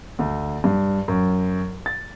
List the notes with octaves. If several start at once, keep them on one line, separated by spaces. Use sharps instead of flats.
D2
G2
F#2
A6